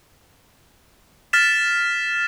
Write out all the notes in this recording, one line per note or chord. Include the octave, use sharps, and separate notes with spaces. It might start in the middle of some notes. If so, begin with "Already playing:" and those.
F6 A6 B6 E7